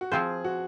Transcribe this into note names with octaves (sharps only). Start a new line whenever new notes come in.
F#4
F3 C4 F4 G#4 C5
F#4